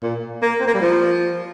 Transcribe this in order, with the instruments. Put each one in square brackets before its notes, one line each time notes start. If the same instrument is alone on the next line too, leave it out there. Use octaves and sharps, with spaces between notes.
[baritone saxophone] A#2
A#3
C4
A#3
G3
F3